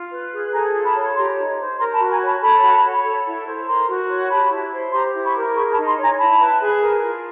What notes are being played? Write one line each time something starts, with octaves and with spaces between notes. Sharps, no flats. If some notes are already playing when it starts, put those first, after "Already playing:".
Already playing: F4
B4
G#4
A4 G#5 A#5
F4
A5 B5
C#5
G4 A#5 C6
D#4
C5
A#4 A#5 C6
A5 B5
F#4
G#5 A#5
C#5 A5 B5
A4 A5 B5
F#4
C#5
A4
E4
C5
A#4 A#5 C6
F#4
C#5
G4 A5 B5
E4
C5
G4 A#5 C6
E4
B5 C#6
A#4
G#4 B5 C#6
A5 B5
D#4
A#5 C6
C#5
G#5 A#5
E4 A5 B5
B4
G#4
A#4
F4